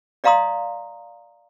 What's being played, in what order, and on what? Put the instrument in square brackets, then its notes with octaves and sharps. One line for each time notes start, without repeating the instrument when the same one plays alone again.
[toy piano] D5 D#5 F5 A#5 C6 D#6